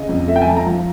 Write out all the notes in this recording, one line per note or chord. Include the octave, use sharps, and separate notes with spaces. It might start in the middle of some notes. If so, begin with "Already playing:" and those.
Already playing: C#3 D#5
F2
A3 E5
G5
G#5
F3 A5
A#5
F3